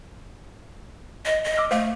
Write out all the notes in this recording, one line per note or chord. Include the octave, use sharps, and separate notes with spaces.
D#5
D#5
D6 E6 F6
A3 C5 D#5 F5